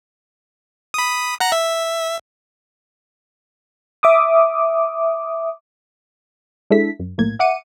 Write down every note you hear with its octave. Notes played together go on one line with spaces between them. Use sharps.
B5 D#6
F#5 A#5 F#6
E5
E5 D6 D#6
G#3 D4 E4 A4 E5 B6
F#2
B1 A2 A#3 G#6
E5 F#5 D6 C#7 D#7